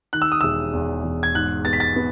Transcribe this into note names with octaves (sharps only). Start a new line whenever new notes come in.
D#3 F#6
E6
D#6
E1 E6
E2
E1
G#6
G#2 F#6
B3 A6
B6
A6
B3